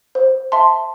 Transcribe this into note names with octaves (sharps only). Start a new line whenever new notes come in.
C5
E5 A5 C6